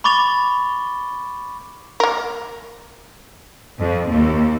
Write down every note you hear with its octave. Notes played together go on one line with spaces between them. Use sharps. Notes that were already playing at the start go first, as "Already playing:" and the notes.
B5 C#6 D6 A6 F7 G7
A#3 A#4
F2
D#2